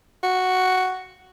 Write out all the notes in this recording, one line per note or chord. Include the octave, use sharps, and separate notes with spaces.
F#4